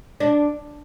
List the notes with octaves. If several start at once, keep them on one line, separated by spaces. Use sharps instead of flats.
D4